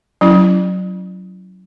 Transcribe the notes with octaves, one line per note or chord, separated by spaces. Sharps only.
F#3 C#4 E4